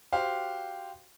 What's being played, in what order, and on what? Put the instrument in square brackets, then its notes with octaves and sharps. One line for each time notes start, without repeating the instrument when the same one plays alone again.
[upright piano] F#4 G4 C5 F5